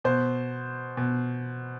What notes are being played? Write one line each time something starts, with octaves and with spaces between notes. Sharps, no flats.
B2 C5
B2